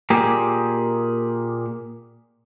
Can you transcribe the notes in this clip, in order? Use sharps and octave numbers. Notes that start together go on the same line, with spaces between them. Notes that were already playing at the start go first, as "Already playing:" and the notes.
A#2 A#3 G4 G#4